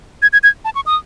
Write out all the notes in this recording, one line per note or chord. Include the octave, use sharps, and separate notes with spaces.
G#6
G#6
G#6
A5
C#6
D#6